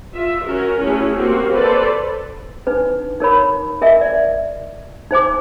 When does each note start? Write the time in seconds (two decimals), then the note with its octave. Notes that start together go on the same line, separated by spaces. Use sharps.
0.14 F4 E5
0.45 C#4 F#4 A#4
0.80 A3 C#4 E4 F#4 G#4
1.13 A#3 C4 F#4 G4
1.53 A4 B4 C5 D5
2.67 D4 D#4 B4
3.20 D#4 A#4 C#5 B5
3.81 A#4 D#5 E5 G#5
4.01 D5
5.11 D#4 C5 G#5 D6